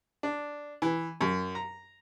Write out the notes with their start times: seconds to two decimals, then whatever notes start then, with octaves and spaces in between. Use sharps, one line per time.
0.23 D4
0.82 E3
1.21 F#2
1.55 A#5